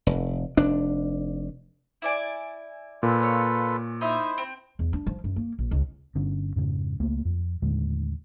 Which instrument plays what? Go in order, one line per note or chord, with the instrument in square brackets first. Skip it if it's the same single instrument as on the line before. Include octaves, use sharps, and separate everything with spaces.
[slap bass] F1
F1 D4
[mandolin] E4 D5 G#5
[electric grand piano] A#2 [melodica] F4 A4 B4
[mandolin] C#5
[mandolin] D#4 D#5 E5 [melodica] E4 C5
[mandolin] C4
[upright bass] E2
D4
F3
F#2
A#3
A#1
C#2
[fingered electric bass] G1 D3 C#4
F2 G#2 C#3
C#2 A3 A#3
F2
D#2 A2 D3 G#3